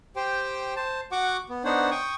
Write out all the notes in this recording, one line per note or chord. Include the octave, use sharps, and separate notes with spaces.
G4 C5 G5
C5 A5
F#4 F#5 C#6 D6
B3
B3 D4 D#4 C5 C#5 F#5
G5 C#6 D#6